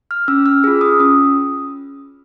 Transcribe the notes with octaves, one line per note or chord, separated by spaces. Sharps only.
F6
C#4 E6
F6
F4 G#4 E6
D#6
C#4 D#6